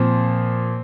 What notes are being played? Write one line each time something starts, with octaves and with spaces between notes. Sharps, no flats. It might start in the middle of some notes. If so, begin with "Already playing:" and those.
Already playing: A#2 F3 C4